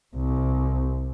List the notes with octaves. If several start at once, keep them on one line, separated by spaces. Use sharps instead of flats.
C2